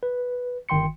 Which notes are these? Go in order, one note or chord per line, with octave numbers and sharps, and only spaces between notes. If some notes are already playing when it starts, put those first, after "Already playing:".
B4
G1 D#3 G5 C6 C#7